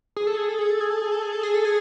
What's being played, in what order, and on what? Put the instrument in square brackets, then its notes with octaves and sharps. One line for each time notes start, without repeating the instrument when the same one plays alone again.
[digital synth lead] G#4
A4
G#4
A4
G#4
A4
G#4
A4
G#4
A4
G#4
A4
G#4
A4
G#4